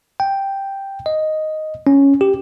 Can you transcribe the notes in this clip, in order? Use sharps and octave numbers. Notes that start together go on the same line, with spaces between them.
G5
D#5
C#4
G4